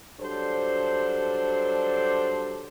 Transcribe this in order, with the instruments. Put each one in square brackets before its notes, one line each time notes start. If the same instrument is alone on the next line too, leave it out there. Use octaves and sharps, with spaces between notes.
[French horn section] F#3 G3 D4 A4 C5